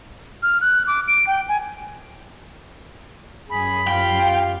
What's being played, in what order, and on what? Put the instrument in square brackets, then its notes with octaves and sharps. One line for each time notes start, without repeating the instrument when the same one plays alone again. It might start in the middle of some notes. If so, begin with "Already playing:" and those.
[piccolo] F6
F#6
D6
D7
G5
G#5
[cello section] F#2 [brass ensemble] G#4 [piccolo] B5
[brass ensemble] F4 G4 F5 [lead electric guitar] G5